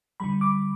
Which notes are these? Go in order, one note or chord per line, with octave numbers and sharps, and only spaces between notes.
D3 G3 B5
D6